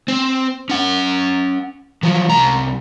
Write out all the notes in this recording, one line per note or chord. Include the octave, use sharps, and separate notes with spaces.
C4
C#4 F#5
F3 F#3
C2 A#5